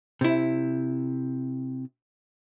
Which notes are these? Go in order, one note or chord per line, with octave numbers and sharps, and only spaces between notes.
C3 E4